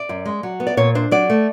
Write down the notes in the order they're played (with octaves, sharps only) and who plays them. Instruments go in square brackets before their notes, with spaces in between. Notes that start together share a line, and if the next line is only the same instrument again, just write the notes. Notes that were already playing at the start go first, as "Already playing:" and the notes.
Already playing: [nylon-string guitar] D5
F#2
G#3
F#3
B3
D5
A#2 C#5
D4 C5
F#3 D5
A3